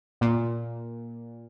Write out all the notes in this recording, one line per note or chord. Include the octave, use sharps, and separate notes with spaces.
A#2